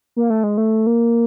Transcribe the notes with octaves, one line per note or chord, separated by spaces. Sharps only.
A#3
A3
G#3
A3
A#3